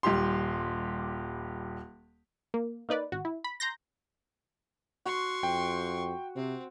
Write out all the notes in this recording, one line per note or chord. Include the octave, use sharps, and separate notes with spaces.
D#1 G3 G4 C6
A#3
A#3 D#4 B4 D5
G#1 F#4
E4
B5
A#5 C6 G6 A#6
F#4 C6 C#6
F2 G5
C3 C4